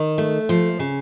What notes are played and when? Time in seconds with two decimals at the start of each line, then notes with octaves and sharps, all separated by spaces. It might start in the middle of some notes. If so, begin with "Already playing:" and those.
Already playing: D#3
0.18 A3
0.49 F3
0.79 C#3